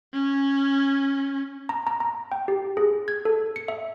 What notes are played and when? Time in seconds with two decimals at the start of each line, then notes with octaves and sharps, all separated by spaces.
0.14 C#4
1.69 A#5
1.87 A#5
2.00 A#5
2.32 G5
2.48 G4
2.77 G#4
3.08 G#6
3.25 A4
3.56 C#7
3.68 E5